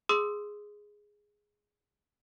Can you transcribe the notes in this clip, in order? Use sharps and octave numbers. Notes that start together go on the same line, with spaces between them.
G#4 C6 D#6 E6